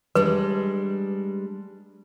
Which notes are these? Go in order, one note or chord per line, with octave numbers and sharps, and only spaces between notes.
G3 G#3 D4 B4